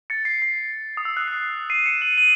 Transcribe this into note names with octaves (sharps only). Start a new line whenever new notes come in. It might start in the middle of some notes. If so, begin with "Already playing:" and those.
A6 C#7
C7
C7
D#6
E6
F#6
C7
C7 D#7
C#7 E7
D#7 F#7
D#7 F#7